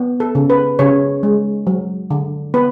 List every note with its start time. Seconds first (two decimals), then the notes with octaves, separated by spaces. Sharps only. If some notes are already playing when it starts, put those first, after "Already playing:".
Already playing: B3
0.20 A4
0.35 C#3
0.50 B4
0.79 C#3 C#5
1.23 G#3
1.67 F#3
2.11 D3
2.54 B3 B4